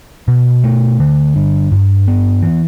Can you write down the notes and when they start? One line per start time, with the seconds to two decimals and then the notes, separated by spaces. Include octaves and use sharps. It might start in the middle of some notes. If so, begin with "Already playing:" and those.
0.28 B2
0.64 A3
1.00 D3
1.36 G2
1.72 G2
2.08 B3
2.43 E3